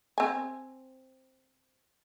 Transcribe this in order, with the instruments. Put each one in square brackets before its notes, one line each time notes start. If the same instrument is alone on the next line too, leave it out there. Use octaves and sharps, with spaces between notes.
[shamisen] C4 G#5